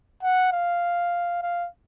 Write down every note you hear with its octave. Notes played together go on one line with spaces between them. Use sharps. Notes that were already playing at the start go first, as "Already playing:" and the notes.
F#5
F5
F5